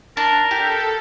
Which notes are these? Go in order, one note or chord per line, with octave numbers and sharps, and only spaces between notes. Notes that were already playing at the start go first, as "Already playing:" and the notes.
D4 A#4
G4 A4